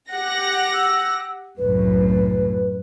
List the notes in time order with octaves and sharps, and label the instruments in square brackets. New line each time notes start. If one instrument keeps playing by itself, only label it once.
[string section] G4 F#5 A#6
[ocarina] E6
[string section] C2 F#2 A2 [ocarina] B4